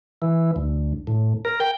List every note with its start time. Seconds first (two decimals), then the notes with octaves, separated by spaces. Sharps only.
0.22 E3
0.56 D2
1.07 A2
1.45 A#4
1.60 G5